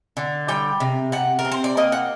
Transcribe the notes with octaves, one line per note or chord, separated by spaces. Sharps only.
D3
G3 G5
C3
C3 F#5
A#4
C4
C5
D5
A#3 D#5
F#5